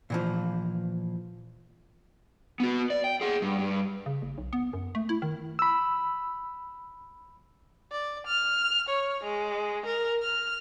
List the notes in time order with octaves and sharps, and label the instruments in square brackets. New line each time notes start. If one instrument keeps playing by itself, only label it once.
[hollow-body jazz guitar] A#2 E3 F3
[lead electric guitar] B3 F#4
D5
G5
G#4 F#5
G2
G2
[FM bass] C#3
F#1
B1
B3
F#2
A3
E4
D#3
[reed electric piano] B5 E6
[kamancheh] D5
F6
C#5
G#3
A#4
F6